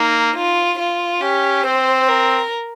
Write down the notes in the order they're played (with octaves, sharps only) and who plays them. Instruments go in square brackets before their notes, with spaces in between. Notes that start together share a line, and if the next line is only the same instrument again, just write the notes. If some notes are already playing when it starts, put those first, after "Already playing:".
Already playing: [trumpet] A#3 [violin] D#4
[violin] F4
F4
[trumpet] C#4 [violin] G4
[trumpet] C4 [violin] C5
[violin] A#4